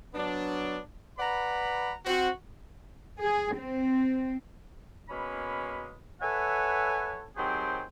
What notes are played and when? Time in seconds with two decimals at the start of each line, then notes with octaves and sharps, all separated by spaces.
0.14 F#3 B3 D4
1.19 B4 D5 F#5 A#5 B5
2.06 C4 F#4
3.22 G#4
3.56 C4
5.09 B2 G#3 A#3 C#4 B5
6.21 A4 B4 C#5 E5 F#5 G#5
7.37 D#3 F#3 C4 G4 G#4 C5